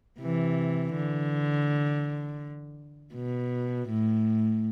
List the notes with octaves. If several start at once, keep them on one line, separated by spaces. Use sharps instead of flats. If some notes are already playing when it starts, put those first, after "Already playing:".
C3 E3
D3
B2
A2